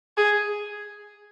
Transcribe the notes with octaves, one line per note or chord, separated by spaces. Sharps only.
G#4